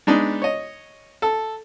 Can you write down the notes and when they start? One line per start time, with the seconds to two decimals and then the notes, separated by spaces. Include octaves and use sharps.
0.07 G#3 B3 D4 D#4
0.42 C#5 D#5
1.22 A4